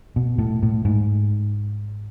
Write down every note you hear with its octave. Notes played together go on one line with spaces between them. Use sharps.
B2
A2
A2
G#2